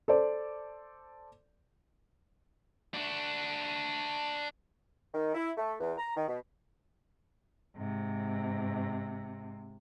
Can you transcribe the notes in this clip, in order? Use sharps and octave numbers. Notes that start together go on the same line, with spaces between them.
A4 C5 D5
D4 F#4
D#3
E4
A3
E2
A#5
D#3
B2
G#2 C3